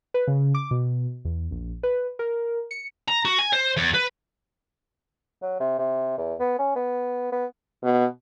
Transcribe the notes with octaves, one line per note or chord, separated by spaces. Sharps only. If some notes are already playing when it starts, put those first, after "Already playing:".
B4
C#3
D6
B2
E2
A#1
B4
A#4
C#7
A#5
F#4
G#5
C5
E2
B4
F#3
C3
C3
E2
B3
C#4
B3
B3
B2